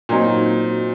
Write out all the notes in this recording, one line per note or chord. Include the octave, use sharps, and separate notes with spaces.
A#2 F#3 C4 D#4